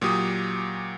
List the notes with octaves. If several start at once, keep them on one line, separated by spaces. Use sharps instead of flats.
A#2 F#3 G4 D#6